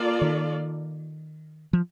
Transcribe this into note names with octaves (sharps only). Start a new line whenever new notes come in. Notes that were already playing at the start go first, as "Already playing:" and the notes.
Already playing: A#3 F4 A4 D5
D#3
F3